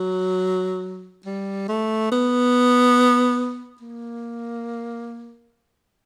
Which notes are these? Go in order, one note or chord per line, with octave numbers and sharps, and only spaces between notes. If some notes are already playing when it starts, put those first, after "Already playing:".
Already playing: F#3
G3
A3
B3
A#3